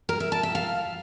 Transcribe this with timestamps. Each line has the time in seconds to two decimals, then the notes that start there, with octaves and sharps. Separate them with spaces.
0.09 A#4
0.20 E5
0.32 A5
0.43 E5
0.55 F5